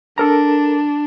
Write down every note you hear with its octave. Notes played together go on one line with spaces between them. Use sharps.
D4 A4 A#4 A#5